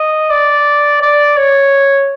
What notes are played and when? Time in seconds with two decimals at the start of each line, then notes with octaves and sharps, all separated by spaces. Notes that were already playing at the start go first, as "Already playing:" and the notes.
Already playing: D#5
0.30 D5
1.01 D5
1.37 C#5